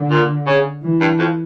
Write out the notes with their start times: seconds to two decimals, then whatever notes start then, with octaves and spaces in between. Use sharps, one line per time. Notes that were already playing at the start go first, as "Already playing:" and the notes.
Already playing: D3
0.10 A#2
0.47 C#3
0.82 E3
1.01 G2
1.19 F2